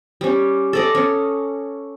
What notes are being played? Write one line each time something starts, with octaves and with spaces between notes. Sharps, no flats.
G3 C#4
A4 D5 D#5
C#4